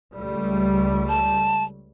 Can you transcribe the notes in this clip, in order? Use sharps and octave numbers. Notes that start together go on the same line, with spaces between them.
C#2 G3 A3
A5